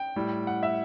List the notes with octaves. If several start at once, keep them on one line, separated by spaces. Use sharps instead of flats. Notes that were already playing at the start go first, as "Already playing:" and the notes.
Already playing: G5
A2 G3
F#5
E5